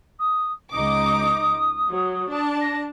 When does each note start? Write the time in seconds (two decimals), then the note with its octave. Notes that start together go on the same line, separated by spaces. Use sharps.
0.19 D#6
0.72 C#2 D#4 D6 D#6
1.89 F#3
2.30 D4 A5
2.61 A#6